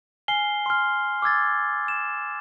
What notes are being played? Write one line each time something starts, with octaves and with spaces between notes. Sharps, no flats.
G#5 F6 C7 G7
C6 F6
D6 E6 G#6 A6
E7